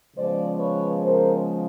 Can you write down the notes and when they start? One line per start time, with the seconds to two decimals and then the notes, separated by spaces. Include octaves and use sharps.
0.15 C#3 F3 G#3 B3 C5 D5
0.58 B4 C#5
1.01 A#4 C5